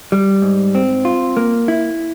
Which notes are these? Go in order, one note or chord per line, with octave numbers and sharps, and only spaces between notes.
G3
G#2
C4
F4
A#3
E4